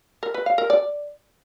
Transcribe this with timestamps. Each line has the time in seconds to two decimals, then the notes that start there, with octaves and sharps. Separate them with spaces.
0.23 A#4
0.34 B4
0.46 F5
0.58 A#4
0.70 D5